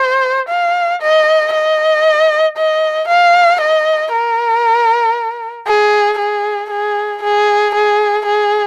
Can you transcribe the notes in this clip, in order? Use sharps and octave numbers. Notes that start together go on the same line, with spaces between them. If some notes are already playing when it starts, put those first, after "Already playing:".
Already playing: C5
F5
D#5
D#5
D#5
F5
D#5
A#4
G#4
G#4
G#4
G#4
G#4
G#4